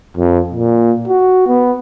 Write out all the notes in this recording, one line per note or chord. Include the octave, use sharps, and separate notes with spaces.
F2
A#2
F#4
B3